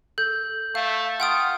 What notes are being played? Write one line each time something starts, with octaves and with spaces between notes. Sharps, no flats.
A4 G6
A3 F5
F4 F#5 G5 D#6